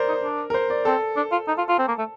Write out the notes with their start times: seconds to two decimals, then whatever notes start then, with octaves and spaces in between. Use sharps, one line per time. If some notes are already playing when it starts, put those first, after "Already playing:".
Already playing: A#4 C5 D5
0.08 D#4
0.24 D4
0.50 A#4
0.54 C5
0.70 D5
0.85 C4 A4
1.16 D4
1.31 F4
1.47 D#4
1.57 F4
1.68 F4
1.78 C4
1.88 A#3
1.98 A3